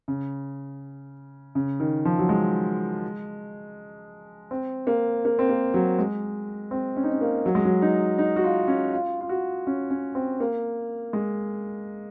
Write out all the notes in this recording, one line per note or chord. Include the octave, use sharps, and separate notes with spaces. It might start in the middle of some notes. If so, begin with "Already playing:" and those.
C#3
C#3
D#3
F3
F#3
G#3
C4
A#3
A#3
C4
A#3
F#3
G#3
C4
C#4
D#4
C#4
A#3
F#3
G#3
F#3
D#4
D#4
F#4
F4
C#4
F4
F4
F#4
C#4
C#4
C4
A#3
G#3